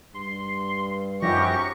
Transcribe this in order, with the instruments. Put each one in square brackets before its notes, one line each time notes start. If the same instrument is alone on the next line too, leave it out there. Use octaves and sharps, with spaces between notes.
[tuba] G2 [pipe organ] C6
[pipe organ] F#2 G4 A#6 [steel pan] F3 D#4 [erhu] C#6